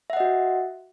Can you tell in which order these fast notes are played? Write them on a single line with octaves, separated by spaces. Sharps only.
E5 F#5 D#5 F#4